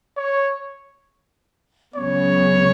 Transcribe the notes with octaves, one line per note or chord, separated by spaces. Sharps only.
C#5
C#2 C#3 F#3 B3 C#5